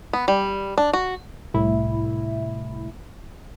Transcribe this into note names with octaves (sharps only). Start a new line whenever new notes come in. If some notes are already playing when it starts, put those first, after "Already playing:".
B3
G3
D4
F#4
C2 A2 E4